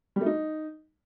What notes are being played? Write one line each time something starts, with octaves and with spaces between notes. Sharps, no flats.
G3
A3
D#4